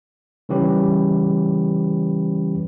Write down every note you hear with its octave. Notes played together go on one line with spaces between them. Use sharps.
C#3 E3 G3 C#4 G4 B4